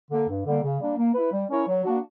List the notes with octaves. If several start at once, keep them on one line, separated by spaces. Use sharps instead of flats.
D3 A#3
G2
D3 G3 A#3
C#3
G3 A#3 D4
A#3
E4 B4
G3
C#4 E4 A#4 C#5
F#3
A#3 D4 F#4